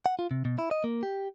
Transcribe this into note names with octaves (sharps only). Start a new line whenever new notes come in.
F#5
F4
C3
B2
E4
D#5
A#3
G4